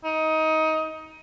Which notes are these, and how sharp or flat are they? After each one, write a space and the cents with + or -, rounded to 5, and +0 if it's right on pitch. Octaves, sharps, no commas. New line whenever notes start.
D#4 +20